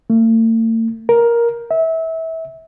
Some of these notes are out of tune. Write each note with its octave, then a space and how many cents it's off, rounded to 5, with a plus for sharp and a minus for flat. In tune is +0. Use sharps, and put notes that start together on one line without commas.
A3 +45
A#4 +10
E5 -25